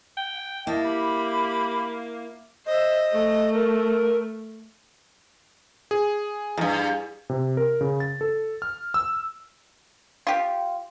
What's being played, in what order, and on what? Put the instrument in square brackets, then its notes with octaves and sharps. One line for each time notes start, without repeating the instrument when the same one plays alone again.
[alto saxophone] G5
[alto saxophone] A#3 [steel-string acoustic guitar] E4 [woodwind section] D#5 A5
[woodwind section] G4 B5
[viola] C5 E5 [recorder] D#5
[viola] A3
[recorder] A#4
[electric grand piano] G#4
[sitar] E2 G2
[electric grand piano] C3
A#4
C#3
A6
A4
F6
E6
[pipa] F4 G4